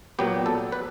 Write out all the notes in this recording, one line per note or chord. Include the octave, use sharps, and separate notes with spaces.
A#2 F#3 B3 G4
A4
B4